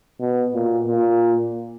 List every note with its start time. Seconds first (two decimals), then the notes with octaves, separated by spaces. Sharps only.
0.20 B2
0.54 A#2
0.88 A#2